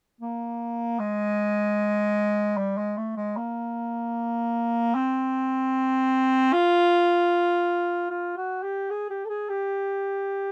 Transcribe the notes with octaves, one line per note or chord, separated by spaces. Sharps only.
A#3
G#3
G3
G#3
A3
G#3
A#3
C4
F4
F4
F#4
G4
G#4
G4
A4
G#4
G4